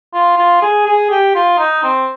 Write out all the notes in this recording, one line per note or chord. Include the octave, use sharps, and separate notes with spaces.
F4
F4
G#4
G#4
G4
F4
D#4
C4